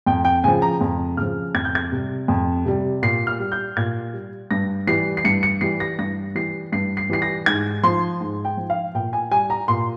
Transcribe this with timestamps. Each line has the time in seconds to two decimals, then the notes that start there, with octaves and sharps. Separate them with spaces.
0.06 F2 G5
0.25 G5
0.44 C#3 F3 G#5
0.62 A#5
0.81 F2
1.17 C#3 F3 F6
1.54 F2 G#6
1.65 G6
1.75 G#6
1.92 C3 G3
2.28 F2
2.65 C3 G3
3.02 A#2 C7
3.27 F6
3.40 G3
3.52 G6
3.77 A#2 G#6
4.13 G3
4.51 G2 A#6
4.87 E3 G3 C7
5.17 C7
5.24 G2 C#7
5.43 C#7
5.61 E3 G3 C7
5.80 A#6
5.99 G2 A#6
6.35 E3 G3 C7
6.72 G2 C7
6.97 C7
7.09 E3 G3 C7
7.22 A#6
7.46 G#2 G#6
7.83 F3 C6
8.20 G#2
8.45 G5
8.57 F3
8.70 F5
8.94 A#2 G5
9.13 G#5
9.31 G3 G#5
9.50 A#5
9.68 A#2 C6